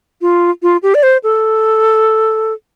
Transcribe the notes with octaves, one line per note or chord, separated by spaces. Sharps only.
F4
F4
G4
D5
C5
A4